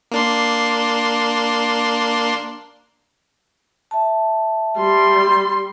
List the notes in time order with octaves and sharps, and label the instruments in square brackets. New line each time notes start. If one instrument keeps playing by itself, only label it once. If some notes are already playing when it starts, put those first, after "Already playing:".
[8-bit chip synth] A#3 D4 C6
[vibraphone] E5 A5
[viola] G3 C6